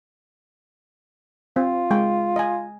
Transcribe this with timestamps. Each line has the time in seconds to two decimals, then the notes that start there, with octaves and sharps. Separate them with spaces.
1.56 C4 F4
1.91 G#3 G5
2.36 D#5 G#5